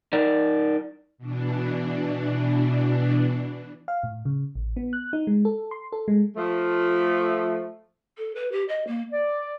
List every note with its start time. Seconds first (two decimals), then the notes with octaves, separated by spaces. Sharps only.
0.13 D#4 A#4 D5
1.18 B2 E3 D4
3.88 F5
4.03 A2
4.25 C#3
4.55 A1
4.76 B3
4.93 F#6
5.13 D#4
5.27 G#3
5.45 A4
5.71 C6
5.92 A4
6.08 G#3
6.36 F3 A3
8.18 A4
8.36 B4
8.52 G4
8.69 D#5
8.87 A#3
9.11 D5